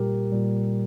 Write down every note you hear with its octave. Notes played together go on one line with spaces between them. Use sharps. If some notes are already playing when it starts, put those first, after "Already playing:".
Already playing: A#2 G3 G4 A#4
A#2 G3